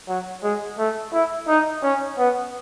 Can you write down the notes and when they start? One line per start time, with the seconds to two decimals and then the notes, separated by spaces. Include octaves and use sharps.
0.08 F#3
0.43 G#3
0.78 A3
1.13 E4
1.48 D#4
1.83 C#4
2.18 B3